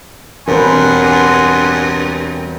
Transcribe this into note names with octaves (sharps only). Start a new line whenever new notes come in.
E1 G2 C4 A#4 B4 F#5 G#5 C6